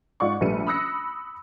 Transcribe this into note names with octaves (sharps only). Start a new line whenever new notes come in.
G#2 F4 D5 F#5 C#6
A#1 G3 A3 B4 C#7 D#7
B5 D#6 E6 F#6 A#6 C#7